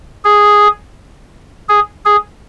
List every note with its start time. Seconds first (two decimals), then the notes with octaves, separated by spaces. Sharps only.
0.24 G#4
1.69 G#4
2.05 G#4